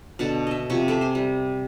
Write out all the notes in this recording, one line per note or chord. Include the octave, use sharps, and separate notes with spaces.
B2 D3 F#5 A5
D#5 E5
C3 F3 E4 C#6
A4 C5 E5 D6
C5 G#5
G3